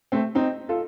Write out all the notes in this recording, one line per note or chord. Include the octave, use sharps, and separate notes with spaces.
A3 C4
C4 D#4
F4 A4